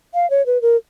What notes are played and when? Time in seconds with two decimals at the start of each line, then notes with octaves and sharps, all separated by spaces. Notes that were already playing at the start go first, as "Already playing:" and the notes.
0.14 F5
0.30 C#5
0.46 B4
0.62 A#4